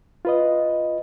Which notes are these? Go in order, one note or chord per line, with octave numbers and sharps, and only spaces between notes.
F4 B4 D#5